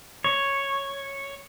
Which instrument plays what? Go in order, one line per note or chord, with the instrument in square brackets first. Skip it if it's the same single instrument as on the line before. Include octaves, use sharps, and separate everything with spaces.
[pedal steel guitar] C#5